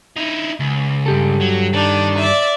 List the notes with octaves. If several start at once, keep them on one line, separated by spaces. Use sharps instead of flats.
D#4 E4
C#2
G2 G4 A4
F#3
D#3 D4
D5 E5